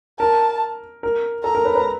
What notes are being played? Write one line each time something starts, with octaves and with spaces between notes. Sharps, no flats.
A#4 A5
A#4
A4 A#5
A#4
B4
B4